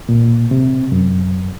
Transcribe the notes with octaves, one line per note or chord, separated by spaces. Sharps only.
A#2
C3
F#2